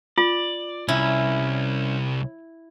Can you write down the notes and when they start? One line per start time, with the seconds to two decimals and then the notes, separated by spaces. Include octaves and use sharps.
0.18 F4 D5
0.88 C2 C#4 E4